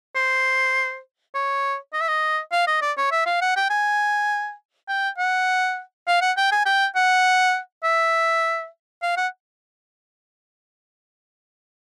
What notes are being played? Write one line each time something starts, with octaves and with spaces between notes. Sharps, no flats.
C5
C#5
D#5
E5
D#5
F5
D#5
D5
C#5
E5
F5
F#5
G5
G#5
G5
F#5
F5
F#5
G5
G#5
G5
F#5
E5
F5
F#5